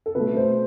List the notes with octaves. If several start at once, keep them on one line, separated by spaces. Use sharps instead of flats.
A4
B2 A3 B4
C5